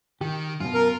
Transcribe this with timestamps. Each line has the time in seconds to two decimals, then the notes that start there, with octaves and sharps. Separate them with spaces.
0.21 D#3 G4
0.60 F#2 B2 F4
0.74 A#4